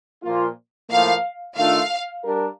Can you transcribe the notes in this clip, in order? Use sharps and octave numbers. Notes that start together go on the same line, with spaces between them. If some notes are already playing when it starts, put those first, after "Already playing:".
A#2 F3 A#3 F4
A2 F3 A#3 F5
D#3 A3 D4 F4 A4 F5
G3 D4 G4 A#4